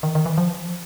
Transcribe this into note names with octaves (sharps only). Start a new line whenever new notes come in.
D#3
D#3
E3
F3